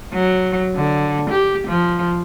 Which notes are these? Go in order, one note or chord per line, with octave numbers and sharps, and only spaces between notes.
F#3
D3
G4
F3